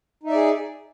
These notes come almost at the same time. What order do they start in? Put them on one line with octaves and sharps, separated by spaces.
D#4 E5 D5 G#4